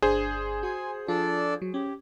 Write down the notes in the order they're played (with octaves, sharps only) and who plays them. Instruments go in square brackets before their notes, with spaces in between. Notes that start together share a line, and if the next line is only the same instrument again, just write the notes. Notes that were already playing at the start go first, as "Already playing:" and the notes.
[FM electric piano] G1 D4 D#6 [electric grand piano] G#4 C5
[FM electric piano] F#4 C6 [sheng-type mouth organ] G#5
[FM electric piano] F3 F4 [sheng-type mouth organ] D4 A4 D5
[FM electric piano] F#3
[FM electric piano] C#4 [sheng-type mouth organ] G4